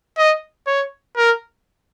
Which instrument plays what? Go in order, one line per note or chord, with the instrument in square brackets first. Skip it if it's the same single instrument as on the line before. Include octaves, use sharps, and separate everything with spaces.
[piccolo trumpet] D#5
C#5
A#4